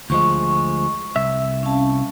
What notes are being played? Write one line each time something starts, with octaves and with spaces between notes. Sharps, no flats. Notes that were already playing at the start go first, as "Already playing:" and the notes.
D2 F3 G#3 C#6
C2 E5
C#4 F5 A5